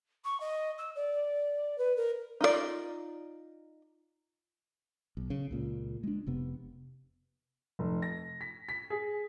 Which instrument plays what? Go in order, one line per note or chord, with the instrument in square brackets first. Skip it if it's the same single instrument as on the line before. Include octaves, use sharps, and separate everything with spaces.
[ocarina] C#6
D#5
E6
D5
B4
A#4
[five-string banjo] D#4 F4 F#4 D5
[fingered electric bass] B1
C#3
C#2 A#2
G#3 D4
F1 C3 B3
[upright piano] F1
A#6
B6
B6
G#4